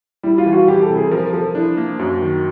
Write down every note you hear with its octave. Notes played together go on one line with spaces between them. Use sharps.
G3 E4
F4
E3
F#4
E3 G4
A4
C3
G#4
F3 A#4
F3 A4
D4 E4
A#3
F#2 F#4
D#3